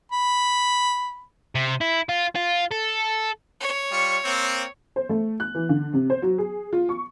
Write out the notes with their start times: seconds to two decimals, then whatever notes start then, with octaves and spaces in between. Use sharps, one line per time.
0.12 B5
1.55 C3
1.81 E4
2.09 F4
2.36 F4
2.71 A4
3.60 C#5
3.92 G3 F4 C#6
4.23 A#3 C4
4.96 C5
5.09 A3
5.40 F#6
5.55 E3
5.69 D3
5.93 C3
6.10 C5
6.22 F#3
6.38 G#4
6.73 F4
6.89 C#6